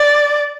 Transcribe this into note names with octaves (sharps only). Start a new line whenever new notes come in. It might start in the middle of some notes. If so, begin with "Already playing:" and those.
Already playing: D5